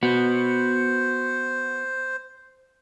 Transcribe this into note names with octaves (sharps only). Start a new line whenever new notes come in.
B3 F#4 C5